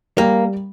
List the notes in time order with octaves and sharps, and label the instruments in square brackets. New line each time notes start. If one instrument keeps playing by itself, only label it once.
[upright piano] G3 [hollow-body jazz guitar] A#3